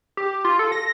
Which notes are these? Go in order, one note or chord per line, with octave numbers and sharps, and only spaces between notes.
G4
F4
A4
A#6